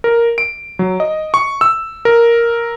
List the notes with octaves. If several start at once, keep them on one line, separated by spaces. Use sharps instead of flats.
A#4
D7
F#3
D#5
C#6
E6
A#4